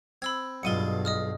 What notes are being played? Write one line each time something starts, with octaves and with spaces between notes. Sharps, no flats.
C4 B5 E6 G#6
B1 G2 B2 G#3 F4 C#7 D#7 G7
D#5 D#6 F6